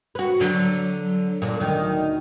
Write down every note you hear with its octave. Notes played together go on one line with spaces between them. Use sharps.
F#4 B4
D3 F#3
A#2 D4
D2 D#3